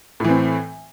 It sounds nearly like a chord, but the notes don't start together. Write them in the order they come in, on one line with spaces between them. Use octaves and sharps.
A2 E3 C4